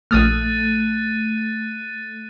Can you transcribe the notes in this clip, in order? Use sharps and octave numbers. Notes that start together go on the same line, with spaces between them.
A#1 A3 D#6 F6 F#6 A6 D#7